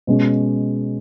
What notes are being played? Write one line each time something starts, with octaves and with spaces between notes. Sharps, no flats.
B2 G#3 C#4